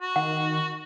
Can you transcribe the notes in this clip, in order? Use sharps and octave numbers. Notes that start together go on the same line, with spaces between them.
F#4
D#3 F#5